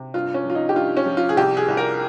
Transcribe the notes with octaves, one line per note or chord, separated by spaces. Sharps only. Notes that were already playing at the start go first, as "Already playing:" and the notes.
Already playing: C3
G2 F4
C#4
F3 F4
D#4
G4
G2 F4
C#4
F3
F4
G#4
C2 G4
G#4
C2
A#4